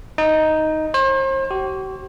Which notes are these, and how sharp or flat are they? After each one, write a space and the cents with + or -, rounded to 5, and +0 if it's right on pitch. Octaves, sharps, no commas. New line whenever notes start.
D#4 +5
C5 +40
G4 -45